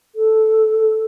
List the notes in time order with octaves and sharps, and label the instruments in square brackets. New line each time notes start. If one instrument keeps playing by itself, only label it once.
[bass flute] A4